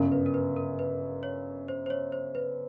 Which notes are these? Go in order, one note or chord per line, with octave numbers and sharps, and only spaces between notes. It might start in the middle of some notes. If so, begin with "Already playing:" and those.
Already playing: G1 F#2 C#3 A#4
B4
A#4
B4
A#4
B4
C#5
C5
C5
C#5
C5
B4